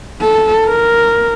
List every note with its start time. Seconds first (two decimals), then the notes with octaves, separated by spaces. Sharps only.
0.21 A4
0.66 A#4